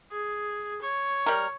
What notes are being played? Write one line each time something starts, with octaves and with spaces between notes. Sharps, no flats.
G#4
C#5
G3 A#4